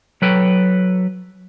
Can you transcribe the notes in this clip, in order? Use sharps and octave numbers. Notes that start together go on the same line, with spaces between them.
F#3 A4 B4 G5